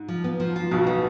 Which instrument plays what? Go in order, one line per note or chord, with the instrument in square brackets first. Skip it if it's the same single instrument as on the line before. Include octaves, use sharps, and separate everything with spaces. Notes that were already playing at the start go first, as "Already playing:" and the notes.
Already playing: [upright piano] G#2
[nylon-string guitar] F3
B3
F3
F4
[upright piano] B1 B2 [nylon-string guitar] F3
[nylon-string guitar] B3